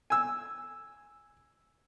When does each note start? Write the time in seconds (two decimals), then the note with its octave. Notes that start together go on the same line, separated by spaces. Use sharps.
0.10 G#5 E6